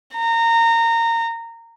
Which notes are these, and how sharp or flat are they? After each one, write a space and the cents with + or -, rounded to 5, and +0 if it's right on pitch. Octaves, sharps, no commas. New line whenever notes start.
A#5 -20